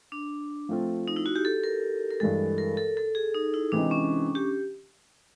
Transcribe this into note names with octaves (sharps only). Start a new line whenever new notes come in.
D4
F3 A3 C4 F4
D#4
E4
F#4
G4
A4
A#4
A#4
G2 E3 G#3 A4
A#4
A4
A4
G#4
D#4
E4
C3 E3 G#3 C4 D4 D#4
C#4
G4